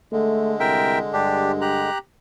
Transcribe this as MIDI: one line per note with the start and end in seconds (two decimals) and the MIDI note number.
0.12 1.90 50
0.12 1.90 56
0.12 0.54 57
0.60 1.00 36
0.60 0.99 70
0.60 0.99 76
0.60 0.99 79
1.13 1.91 43
1.13 1.52 62
1.13 1.52 67
1.61 1.98 67
1.61 1.98 82
1.61 1.98 90